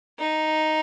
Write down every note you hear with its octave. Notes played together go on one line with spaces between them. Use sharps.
D#4